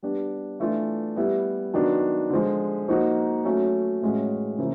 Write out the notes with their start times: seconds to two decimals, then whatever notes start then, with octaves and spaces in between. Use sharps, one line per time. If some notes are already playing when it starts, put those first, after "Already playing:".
0.03 G3 B3 D4
0.60 E3 A3 D4 F4
1.16 G3 B3 E4
1.73 D#3 F#3 B3 D4
2.30 D3 F3 G#3
2.88 F3 A#3 D#4 F#4
3.45 F#3 A3 C#4
4.02 A2 E3 G#3 C#4 F#4
4.58 C#3 F3 A#3 E4